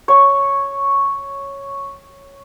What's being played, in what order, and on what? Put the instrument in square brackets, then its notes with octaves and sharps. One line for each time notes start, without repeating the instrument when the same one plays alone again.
[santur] C#5 C#6